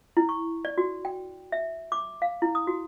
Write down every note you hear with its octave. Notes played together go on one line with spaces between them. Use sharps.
E4
C#6
D5
F#4
G5
E5
D6
F5
E4
D#6
F#4